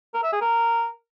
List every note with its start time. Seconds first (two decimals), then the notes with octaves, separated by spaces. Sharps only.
0.14 A#4
0.23 E5
0.33 G#4
0.42 A#4